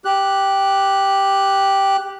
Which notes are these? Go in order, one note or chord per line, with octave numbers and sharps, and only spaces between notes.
G4 F#6